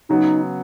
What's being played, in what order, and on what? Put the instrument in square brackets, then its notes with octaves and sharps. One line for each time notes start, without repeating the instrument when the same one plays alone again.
[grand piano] C#3 F#3 B3 [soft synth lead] D#4